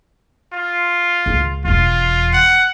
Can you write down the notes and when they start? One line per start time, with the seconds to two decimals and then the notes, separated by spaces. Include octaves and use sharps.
0.53 F4
1.26 C#2
1.65 E1 E2 F4
2.33 F#5